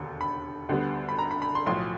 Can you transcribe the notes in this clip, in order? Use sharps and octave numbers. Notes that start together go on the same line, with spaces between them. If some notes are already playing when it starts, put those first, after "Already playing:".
Already playing: E1 D#2 D3
B5
D2 D3 G3 B3
B5
A#5
B5
B5
C6
B1 A2 F3 C6